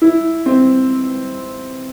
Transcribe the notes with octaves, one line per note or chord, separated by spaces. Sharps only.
E4
C4